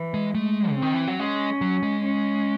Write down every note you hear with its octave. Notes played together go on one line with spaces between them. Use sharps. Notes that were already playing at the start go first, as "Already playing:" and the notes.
Already playing: E3
G#3
G#3 A3
C#3
D#3 C4
E3
F#3
G#3 C#4
F#3
G#3
C#4